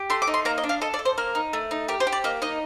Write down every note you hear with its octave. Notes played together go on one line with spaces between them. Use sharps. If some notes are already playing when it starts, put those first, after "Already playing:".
Already playing: G4
A3 C6
D6
D#4
C6
A#3 A#5
D#5
D4
F5
A4 D#5
D5
A4
C5
A#3 A#4
D#4
A3
D#4
G4 A#4
C5
G4
D5
A#3 D#5
D#4 D#5